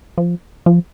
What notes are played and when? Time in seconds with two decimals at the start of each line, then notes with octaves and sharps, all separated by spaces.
0.18 F3
0.66 F3